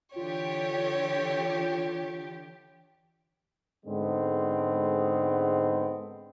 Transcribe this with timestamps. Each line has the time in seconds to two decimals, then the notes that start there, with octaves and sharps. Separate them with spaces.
0.16 D3 E3 F4 G4 C#5
3.85 G#2 D3 G#3 B3 C4